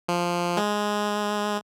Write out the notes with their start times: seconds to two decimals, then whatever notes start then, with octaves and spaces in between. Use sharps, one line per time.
0.09 F3
0.57 G#3